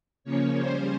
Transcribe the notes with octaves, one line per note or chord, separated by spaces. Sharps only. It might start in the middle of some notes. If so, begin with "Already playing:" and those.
C#3 F3 A#3 C#4 C#5
C#3 G3 C#4 C5